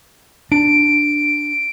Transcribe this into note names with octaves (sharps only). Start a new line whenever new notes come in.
D4 D7